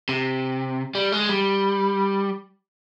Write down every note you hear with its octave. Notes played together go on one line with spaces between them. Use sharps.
C3
G3
G#3
G3